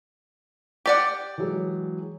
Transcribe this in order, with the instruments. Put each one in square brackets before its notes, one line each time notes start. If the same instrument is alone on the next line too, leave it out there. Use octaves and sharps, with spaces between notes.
[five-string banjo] G4 D5 F#5
[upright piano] E3 F#3 G#3